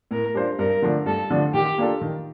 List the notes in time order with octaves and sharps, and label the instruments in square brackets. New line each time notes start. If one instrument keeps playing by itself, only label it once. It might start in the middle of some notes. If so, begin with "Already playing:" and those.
[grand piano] A2 [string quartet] A#4
[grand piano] G3 D4 F4 C5
[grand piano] G2 [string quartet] A#4
[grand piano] D3 F3 A3 D4
[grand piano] G2 [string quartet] A4
[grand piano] D3 F3 A3 D4
[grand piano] D#3 [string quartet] G4
[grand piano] A#3 D4 F4 A4
D#3